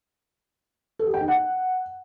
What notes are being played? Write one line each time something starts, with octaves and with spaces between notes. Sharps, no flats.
A4
G4
G5
D#4
F#5